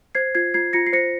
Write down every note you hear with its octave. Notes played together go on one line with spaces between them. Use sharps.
C5 G#6 C7
F4 G#6 C7
F4 G#6 C7
F4 A#6 C#7
C7
C5 A#6 C#7